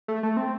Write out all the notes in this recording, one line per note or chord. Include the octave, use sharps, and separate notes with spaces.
A3
A3
C4